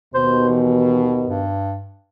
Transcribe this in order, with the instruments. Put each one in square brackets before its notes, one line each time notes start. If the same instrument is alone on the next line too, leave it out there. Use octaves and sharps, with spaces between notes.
[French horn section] D#2 B2 [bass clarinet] C5
[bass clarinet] E3
G2